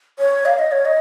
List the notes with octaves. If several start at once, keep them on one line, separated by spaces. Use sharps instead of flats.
C#5
F5
D#5
C#5
D#5